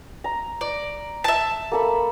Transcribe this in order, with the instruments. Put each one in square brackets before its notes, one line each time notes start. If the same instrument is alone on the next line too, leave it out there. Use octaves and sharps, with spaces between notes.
[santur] A#5
[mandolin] D5
E5 A5
[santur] A#3 A4 B5